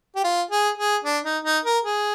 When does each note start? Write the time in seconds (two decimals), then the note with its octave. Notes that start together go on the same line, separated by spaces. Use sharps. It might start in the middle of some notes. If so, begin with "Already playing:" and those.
0.16 G4
0.24 F4
0.51 G#4
0.78 G#4
1.05 D4
1.24 D#4
1.45 D#4
1.65 A#4
1.84 G#4